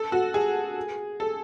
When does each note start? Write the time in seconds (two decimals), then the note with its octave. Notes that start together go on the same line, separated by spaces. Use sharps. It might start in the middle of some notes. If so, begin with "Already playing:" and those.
Already playing: A4
0.12 F#4
0.34 G#4
1.20 A4